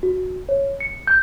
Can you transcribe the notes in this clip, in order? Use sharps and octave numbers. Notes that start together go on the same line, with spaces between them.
F#4
C#5
C#7
G6